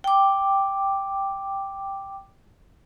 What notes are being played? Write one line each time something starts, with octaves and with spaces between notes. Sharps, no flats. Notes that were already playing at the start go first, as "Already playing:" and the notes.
G5 D6